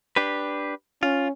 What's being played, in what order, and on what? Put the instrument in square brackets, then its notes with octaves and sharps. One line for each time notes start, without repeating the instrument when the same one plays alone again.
[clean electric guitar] D4 G4 B4
[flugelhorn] C#4 [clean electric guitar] F4